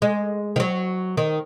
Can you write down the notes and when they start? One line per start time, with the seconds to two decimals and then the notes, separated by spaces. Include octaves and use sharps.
0.02 G#3
0.56 D#3
0.60 F#3
1.17 D#3